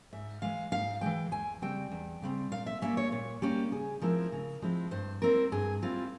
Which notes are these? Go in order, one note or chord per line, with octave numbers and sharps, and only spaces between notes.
G#2 E5
E3 G#3 F5
G#2 F5
E3 G#3 G5
E2 G#5
C#3 G3 C4 G5
E2
C#3 G3 C4
A#2 F5
E5
G3 A#3 C#4 E5
C#5
A#2 C#5
G3 A#3 C#4 G4
C#3 G#4
F3 G#3 C4 E4 A#4
C#3
F3 G#3 C4 E4
G2 C5
G3 C4 E4 A#4
G2 G#4
G3 C4 E4 F4